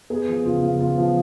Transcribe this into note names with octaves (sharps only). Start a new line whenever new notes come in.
B3 G#4
F3
C#3 F4
C#3
B3 F4
F3